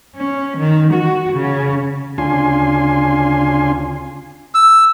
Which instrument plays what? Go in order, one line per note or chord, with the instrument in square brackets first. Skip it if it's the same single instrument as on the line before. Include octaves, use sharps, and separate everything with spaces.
[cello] C#4
D#3
F#4
C#3
[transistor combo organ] D2 C#3 D4 F4 G#5 C6
[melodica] E6